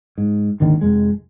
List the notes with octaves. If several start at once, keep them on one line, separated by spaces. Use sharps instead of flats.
G#2
G#1 D#2 D3 D#3
F1 F2 G#3